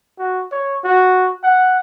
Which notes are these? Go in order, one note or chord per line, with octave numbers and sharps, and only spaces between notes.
F#4
C#5
F#4
F#5